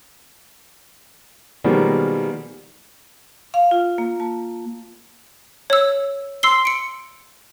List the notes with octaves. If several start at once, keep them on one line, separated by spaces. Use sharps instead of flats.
B2 D#3 F3 G3 G#3 A#3
F5
F4
A#3
A5
C#5 E6
C6 E6 C7 G7
C#7 D7